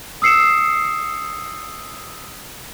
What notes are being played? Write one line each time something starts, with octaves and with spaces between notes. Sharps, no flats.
D#6 E6 C7 C#7 E7